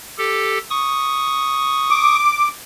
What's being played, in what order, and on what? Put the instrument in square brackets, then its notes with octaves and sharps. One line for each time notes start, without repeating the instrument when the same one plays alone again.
[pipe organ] G4 A4
C#6 D#6
[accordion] D6